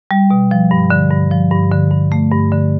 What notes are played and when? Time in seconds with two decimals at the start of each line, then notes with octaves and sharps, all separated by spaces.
0.11 G3
0.30 B2
0.51 F3
0.71 G2
0.90 D3
1.11 G2
1.31 F3
1.51 G2
1.71 D3
1.91 G2
2.12 A3
2.31 G2
2.52 D3